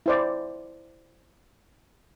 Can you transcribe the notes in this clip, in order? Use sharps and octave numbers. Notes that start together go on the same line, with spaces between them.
E4 C5 D5